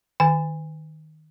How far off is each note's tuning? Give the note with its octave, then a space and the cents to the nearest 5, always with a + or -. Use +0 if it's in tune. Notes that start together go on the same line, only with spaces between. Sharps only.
D#3 +0 G#5 -20